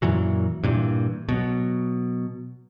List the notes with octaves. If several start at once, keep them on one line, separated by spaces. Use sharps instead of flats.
F#2 A#2 E3 F#3
G2 A#2 E3
B2 F#3